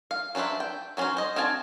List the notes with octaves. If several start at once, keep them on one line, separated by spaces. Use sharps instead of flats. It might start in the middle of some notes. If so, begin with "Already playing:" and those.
F5
F#3 D4 B4 C5 E5
G5
F#3 B3 C#4 F#4 C5
C5 D#5
C4 F#4 F5 G#5 A5